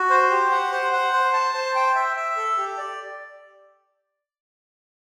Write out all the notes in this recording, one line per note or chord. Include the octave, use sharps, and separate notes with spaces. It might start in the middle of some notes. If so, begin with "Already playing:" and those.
Already playing: F#4
C5
G4
F#5
C5
F#5
C5
A5
C5
G5
E5
E5
A4
G4
D5